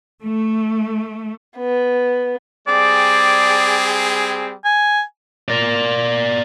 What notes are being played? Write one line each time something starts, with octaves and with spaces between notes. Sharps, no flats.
A3
B3
G3 C4 G#4 D5
G#5
A#4 D5